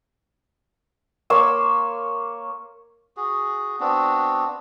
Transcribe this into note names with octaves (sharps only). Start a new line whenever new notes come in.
A#3 C#5 C6 E6
F#4 G#4
B3 C4 D4 F#4